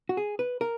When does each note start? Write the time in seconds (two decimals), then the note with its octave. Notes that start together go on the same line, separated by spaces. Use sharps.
0.09 F#4
0.17 G#4
0.39 B4
0.61 A#4